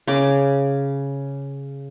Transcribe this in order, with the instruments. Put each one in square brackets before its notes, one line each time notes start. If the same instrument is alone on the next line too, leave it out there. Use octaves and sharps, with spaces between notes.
[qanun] C#3 D6